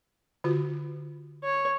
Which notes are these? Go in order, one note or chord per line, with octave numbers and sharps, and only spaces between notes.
D3 F4 F#4
C#5